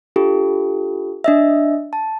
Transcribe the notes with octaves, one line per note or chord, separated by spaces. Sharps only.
D4 F4 G4 A4
D4 D#5 E5
A5